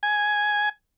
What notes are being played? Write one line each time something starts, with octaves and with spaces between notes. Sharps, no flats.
G#5